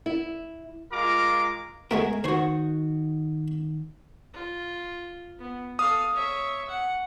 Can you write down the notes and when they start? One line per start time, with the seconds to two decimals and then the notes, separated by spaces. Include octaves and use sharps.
0.06 E4
0.92 G#3 F4 A#4 A#5 D6
1.91 G#3 A3 B3 G#4 A#4
2.24 D#3 F#4 C5 C#5
4.33 F4
5.39 B3
5.79 A4 F5 D#6
6.14 C#5 E5
6.69 F#5